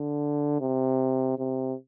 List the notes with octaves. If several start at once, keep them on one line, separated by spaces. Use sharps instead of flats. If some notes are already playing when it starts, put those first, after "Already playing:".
Already playing: D3
C3
C3